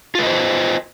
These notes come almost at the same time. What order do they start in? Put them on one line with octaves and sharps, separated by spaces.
F4 B4 D#5 C5